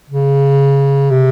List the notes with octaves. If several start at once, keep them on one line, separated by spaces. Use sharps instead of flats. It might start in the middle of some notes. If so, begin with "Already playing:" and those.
C#3
C3